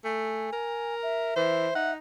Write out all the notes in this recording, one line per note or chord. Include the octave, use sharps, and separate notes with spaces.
A3 G#5
A#4
E5
E3 C5
D#4 F#5